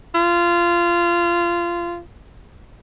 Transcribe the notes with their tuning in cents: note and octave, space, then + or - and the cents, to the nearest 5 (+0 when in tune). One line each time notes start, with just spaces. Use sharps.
F4 -20